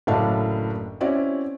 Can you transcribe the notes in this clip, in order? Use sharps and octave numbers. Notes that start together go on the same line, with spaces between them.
F#1 A2 D4 E5 F5 A5
C4 C#4 E4 F#4 D5